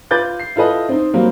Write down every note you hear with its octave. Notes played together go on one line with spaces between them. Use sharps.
F4 B4 D6 G6 A6
C7
E4 F4 A4 B4 D#5
C4 D#4
F#3 G3 A#3 C4